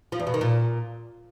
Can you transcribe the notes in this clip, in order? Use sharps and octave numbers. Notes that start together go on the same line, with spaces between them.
F3
E2
B2
D#3
A#2